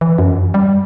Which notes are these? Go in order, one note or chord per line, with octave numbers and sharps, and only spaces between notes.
E3
F#2
G3